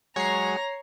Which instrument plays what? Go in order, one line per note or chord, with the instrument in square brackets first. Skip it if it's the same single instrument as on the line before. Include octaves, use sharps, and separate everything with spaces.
[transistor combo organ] F#3 G#3 [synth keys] C#5 C7 [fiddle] A#5